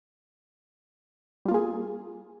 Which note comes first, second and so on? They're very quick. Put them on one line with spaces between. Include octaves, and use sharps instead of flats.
G3 F4 A#3 G#4